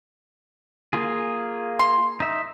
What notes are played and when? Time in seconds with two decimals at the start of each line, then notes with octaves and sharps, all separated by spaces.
0.93 A#3 F4 G#4
1.79 C6
2.20 D#4 E5